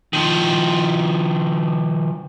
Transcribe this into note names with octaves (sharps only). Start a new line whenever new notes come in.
D#3 F3